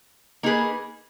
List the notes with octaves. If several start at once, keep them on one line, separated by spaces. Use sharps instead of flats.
A#3 D#4 G#4 B4